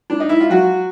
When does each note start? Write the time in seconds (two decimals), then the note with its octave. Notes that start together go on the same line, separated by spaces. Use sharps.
0.10 D4
0.20 D#4
0.29 E4
0.40 F4
0.49 F#3 F#4